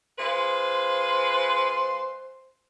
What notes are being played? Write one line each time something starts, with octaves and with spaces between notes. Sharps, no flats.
G#3 F4 B4 C5